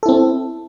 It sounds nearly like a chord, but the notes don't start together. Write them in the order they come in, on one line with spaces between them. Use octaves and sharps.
A4 E4 C4